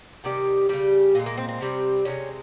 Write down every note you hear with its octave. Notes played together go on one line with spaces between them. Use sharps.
C3 D#3 G3 G4
C#3 G3 G4
A#2 F3 G#3
A#3
C4
C4
C3 G3
C3 D#3 G#3 C#4